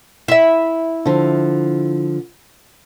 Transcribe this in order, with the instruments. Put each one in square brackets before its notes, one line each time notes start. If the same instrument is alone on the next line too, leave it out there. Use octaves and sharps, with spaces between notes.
[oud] E4 E5
[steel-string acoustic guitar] D3 F3